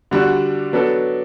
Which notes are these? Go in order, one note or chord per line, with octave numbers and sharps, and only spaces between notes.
D3 G3 D4 F#4
F#3 B3 D4 A4